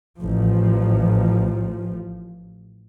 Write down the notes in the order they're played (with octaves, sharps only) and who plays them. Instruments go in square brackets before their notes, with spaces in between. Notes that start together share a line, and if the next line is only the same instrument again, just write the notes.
[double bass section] A1 F3